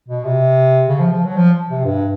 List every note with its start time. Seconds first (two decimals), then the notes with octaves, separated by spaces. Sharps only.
0.08 B2
0.25 C3
0.89 C#3
1.00 F3
1.12 F3
1.25 F#3
1.37 F3
1.69 C3
1.85 G2